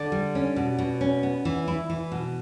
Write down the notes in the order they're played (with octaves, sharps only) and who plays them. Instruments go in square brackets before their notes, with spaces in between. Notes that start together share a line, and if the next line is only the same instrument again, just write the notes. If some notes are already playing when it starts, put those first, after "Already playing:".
Already playing: [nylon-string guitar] D3 [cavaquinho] D5
[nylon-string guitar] G3
C#4
B2
B2
C#4
B3
E3
E4
E3
B2